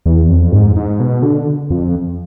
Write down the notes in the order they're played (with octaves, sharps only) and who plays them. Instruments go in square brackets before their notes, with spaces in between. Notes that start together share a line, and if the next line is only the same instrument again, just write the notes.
[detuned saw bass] E2
F2
G#2
G#2
B2
D3
F2